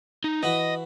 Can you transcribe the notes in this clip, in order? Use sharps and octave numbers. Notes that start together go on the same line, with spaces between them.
D#4
E3 F#4 B4 D#5